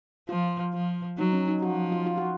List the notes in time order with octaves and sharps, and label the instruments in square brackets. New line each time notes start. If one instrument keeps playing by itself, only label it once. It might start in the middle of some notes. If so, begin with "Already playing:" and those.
[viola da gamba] F3 [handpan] F4
[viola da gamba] F3
[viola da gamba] F#3 [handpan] D#4
[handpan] C#4
D#4
[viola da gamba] F3 [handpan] F#4
[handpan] F4
F4
F#4